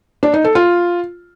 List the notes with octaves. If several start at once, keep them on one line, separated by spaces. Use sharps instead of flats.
D4
D#4
A4
F4